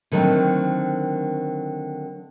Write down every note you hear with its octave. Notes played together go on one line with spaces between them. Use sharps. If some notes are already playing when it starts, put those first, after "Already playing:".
D3 D#3 F#3 G3 A3 C4